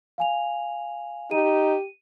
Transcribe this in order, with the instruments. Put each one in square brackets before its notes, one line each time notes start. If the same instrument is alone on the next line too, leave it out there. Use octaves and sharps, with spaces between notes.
[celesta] F5 G#5 F7
[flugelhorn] D#4 [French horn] G4 [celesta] D#7